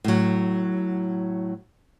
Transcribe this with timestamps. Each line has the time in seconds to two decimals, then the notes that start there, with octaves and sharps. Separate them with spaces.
0.04 A2 F#3